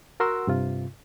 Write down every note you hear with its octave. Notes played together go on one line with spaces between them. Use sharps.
F#4 A#4 F#5 C6 E6
G2 C3 F4